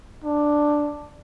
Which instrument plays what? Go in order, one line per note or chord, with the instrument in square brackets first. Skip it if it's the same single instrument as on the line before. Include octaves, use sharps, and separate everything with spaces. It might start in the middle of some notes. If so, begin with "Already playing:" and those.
[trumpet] D4